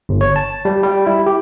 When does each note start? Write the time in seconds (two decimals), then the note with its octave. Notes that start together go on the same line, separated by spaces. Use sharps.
0.09 G1
0.21 C#5
0.36 A5
0.65 G3
0.83 G3
1.07 E4
1.26 G4